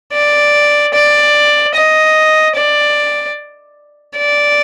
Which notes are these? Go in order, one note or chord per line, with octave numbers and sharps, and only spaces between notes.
D5
D5
D#5
D5
D5